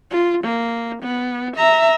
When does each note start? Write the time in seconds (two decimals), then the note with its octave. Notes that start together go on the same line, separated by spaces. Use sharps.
0.11 F4
0.44 A#3
1.03 B3
1.57 E5 A#5